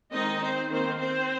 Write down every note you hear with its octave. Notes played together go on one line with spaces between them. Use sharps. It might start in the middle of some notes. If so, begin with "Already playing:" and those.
D#3 G#3 C4 D#4 D#5
C4 C5
D#3 A#3 C4 C5
C4 C5